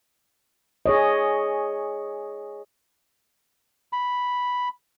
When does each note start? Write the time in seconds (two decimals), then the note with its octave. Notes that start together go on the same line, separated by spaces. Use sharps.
0.86 G#4 C#5 D#5
3.93 B5